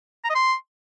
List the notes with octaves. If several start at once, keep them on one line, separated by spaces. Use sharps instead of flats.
A#5
D#5
C6